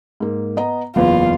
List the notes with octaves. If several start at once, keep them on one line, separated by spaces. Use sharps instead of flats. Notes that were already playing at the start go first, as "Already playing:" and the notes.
G#2 A#3
B3 D#5 A#5
F#1 E2 F4 B4